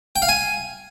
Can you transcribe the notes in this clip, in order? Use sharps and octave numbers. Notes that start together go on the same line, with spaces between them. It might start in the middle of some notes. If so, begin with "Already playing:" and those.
G5
F5
G#5